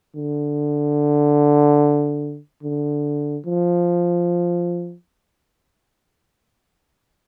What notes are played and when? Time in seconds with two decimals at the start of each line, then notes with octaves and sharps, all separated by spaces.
0.16 D3
2.63 D3
3.46 F3